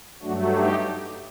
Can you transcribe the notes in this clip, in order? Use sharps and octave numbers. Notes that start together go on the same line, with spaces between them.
G2 F#3 A3 D4 F#4
D#4 G4